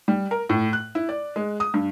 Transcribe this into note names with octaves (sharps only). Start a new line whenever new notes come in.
G3
A#4
A2
F#6
E4
D5
G#3
D#6
G2